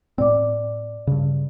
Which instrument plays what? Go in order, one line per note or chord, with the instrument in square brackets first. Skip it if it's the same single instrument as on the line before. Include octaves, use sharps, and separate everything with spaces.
[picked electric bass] A2 C4 [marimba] D5 D6
[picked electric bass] G2 C#3